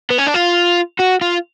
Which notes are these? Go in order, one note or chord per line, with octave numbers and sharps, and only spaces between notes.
B3
C#4
D4
F4
F#4
F4